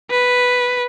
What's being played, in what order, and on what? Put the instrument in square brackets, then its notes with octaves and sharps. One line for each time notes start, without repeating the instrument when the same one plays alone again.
[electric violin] B4